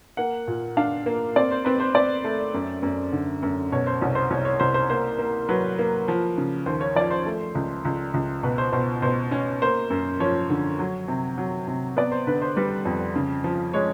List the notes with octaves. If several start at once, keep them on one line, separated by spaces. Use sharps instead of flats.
A#3 F#5
A#2
D4 F5
A#3
C4 D5
C5
C4 B4
C5
C4 D5
A3
F#2
F#2
D3
F#2
B2 C#5
C5
C2 C#5
C5
C2 C#5
C#5
C2 C5
C5
A#3 C5
A#3
F#3 B4
A#3
F3
C#3
D#2 C5
C#5
F3 D5
C5
A3
C#2
C#2
C#2
B2 B4
C5
B2 C5
B2 C5
C#4
A#3 C5
F#2
F3 C#5
D3
F#3
C3
F#3
C3
B3 D5
C5
D3 B4
C5
G3 B4
F2
C#3
F3
G#3 C#5